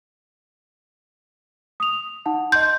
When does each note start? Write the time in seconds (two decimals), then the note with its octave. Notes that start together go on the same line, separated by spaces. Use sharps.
1.80 D#6 F7
2.26 D#4 F#5 A5
2.52 D#5 C6 G6